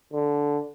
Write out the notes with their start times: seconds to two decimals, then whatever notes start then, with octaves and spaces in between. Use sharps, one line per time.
0.13 D3